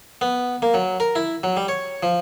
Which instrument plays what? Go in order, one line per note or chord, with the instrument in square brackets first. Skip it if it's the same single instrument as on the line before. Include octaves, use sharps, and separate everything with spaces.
[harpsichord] B3
A#3
F#3
A#4
E4
F#3
G3
C#5
F3